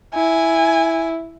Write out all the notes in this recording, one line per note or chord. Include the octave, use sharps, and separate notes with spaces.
E4 G#5